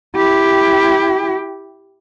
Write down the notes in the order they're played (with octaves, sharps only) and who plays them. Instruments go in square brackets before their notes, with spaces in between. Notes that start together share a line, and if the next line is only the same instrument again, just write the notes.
[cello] E4 G4